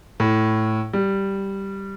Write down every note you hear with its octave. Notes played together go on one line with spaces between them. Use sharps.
A2
G3